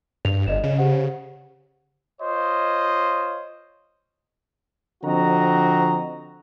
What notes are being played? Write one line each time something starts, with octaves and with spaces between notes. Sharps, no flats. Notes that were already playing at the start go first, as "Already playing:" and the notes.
G2 F7
G1 D5 D#5 E7
C#3
G4 C5 F#5
F4 C5 C#5 D#5
D3 F3 C4 F#4 D#5 A#5